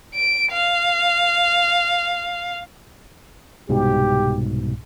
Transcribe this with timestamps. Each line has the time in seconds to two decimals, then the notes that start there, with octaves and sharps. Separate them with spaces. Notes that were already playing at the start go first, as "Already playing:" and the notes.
0.15 D7
0.52 F5
3.69 C2 G#2 B2 G4